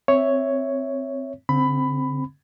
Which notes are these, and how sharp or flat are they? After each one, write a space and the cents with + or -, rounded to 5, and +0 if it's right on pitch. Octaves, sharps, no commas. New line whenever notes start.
C4 +0 C#5 +0 E5 +0
D3 -45 C4 +0 B5 +15